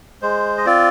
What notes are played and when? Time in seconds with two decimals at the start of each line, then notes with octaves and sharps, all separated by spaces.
0.22 G#3 C5
0.58 D#5
0.66 C4 F4 D5